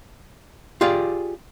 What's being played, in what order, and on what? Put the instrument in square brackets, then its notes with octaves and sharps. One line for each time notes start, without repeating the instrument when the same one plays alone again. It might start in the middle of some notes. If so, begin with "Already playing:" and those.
[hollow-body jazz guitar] F4 G4 G#4 D5 F5